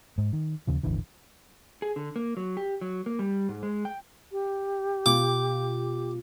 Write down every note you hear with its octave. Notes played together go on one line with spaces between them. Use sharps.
G#2
D#3
D#2 C#3 F3
D#1 G#1 D3 E3
G#4
D3
A#3
F#3
G4
F#3
A#3
G3
G#2
G#3
G5
G4
B2 F4 D6